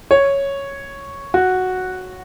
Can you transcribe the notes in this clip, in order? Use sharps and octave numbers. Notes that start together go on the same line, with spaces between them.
C#5
F#4